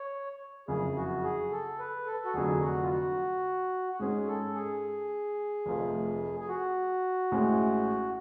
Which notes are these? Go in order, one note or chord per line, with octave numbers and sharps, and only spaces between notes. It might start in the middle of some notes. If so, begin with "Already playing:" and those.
Already playing: C#5
F#1 F2 C#3 G#4
F#4
G#4
A4
B4
A4
F#4
F1 F2 D3 F#3 G#4
F#4
F4
F#4
F#4
G#2 G#3 C#4 G#4
A4
G#4
F1 F2 F3 A3
G#4
F#4
A1 A2 G#3 C#4